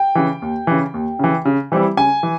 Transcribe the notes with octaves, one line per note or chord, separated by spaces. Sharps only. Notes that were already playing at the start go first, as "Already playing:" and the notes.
Already playing: G5
C#3 E3
D#2
C#3 E3
D#2
C#3 E3
C#3
E3 G3 C4 E4
C#3 G#5
E3